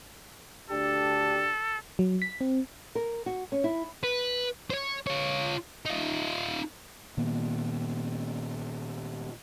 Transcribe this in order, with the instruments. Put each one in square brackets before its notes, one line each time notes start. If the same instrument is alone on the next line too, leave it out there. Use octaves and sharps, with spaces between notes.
[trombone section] D2 D4 G4 [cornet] A4
[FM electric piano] F#3
B6
C4
[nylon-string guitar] A#4
F#4
C#4
E4
[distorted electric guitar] B4
C5 C#5
F4 C#5
D#4 F4
[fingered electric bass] A#2 D#3 A#3 B3